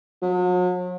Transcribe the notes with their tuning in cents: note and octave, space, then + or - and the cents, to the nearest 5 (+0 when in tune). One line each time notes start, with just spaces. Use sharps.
F#3 -45